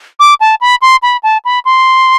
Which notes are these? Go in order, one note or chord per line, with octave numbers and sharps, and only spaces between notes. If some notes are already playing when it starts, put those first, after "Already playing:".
D6
A5
B5
C6
B5
A5
B5
C6